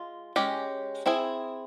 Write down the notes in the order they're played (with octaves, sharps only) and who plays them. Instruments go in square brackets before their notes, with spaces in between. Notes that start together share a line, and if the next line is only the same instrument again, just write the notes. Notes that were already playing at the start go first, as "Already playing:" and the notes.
Already playing: [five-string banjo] G#3 F4
G#3 C#4 G4
C4 E4 G#4